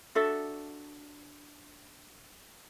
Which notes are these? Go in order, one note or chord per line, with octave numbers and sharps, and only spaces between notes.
D4 F#4 A4 E5